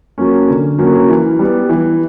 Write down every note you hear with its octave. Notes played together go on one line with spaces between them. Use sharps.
F#3 A#3 C#4
D3
F#3 A#3 C#4
E3
G3 B3
E3